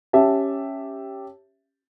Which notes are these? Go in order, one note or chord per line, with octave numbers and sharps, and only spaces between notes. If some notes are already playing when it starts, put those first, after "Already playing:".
C#4 G4 E5 A5